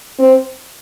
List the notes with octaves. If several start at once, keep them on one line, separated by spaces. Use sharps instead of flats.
C4